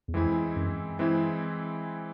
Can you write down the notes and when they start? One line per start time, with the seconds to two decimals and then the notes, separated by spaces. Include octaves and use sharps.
0.08 E2
0.14 F2 E3 G#3 C4 E4
0.56 F#2
0.99 E3 G#3 C4 E4